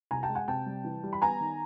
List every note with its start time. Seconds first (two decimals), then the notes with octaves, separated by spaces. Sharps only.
0.11 C2 G#5 A#5
0.23 G5 A5
0.29 G#3
0.35 F#5 G#5
0.48 C3 G5 A5
0.66 G3
0.84 E3
1.03 G3
1.13 B5
1.22 B3 G#5 A#5
1.41 D#3